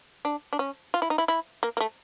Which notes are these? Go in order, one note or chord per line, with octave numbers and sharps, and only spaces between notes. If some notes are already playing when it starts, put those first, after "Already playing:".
D4
D4
C#4
F4
E4
D#4
E4
E4
A#3
A#3
A3